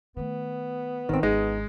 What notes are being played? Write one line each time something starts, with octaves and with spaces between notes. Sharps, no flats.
D#3 A3 B3
G#1 D#3 C4
G#1 G#3 C#4 D#4